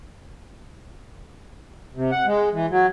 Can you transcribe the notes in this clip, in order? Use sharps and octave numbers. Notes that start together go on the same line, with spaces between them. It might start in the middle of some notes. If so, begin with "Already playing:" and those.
C3
F#5
G#3
E3
F#3